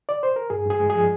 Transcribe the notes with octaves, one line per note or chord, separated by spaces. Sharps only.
D5
C5
A#4
G2 G#4
G2
G#4
G#3
G#4
F3